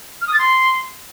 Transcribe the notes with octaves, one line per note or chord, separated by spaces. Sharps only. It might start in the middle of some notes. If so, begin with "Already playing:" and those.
F6
D#6
A6
C6